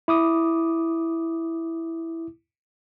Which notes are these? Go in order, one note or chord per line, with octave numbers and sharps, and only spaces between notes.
E4 D6 D#6